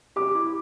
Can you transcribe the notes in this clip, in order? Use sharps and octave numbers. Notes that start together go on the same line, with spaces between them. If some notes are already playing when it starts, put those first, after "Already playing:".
G4 D6
E4